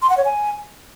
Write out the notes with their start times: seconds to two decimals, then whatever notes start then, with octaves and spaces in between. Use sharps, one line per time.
0.02 C6
0.10 F#5
0.17 C#5
0.25 G#5